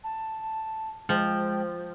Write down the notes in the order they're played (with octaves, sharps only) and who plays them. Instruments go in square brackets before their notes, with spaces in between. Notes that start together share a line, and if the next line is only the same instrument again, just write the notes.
[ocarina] A5
[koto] F3 [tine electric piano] G#3 [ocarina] G5